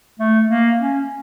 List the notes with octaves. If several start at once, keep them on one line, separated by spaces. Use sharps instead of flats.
A3
A#3
C#4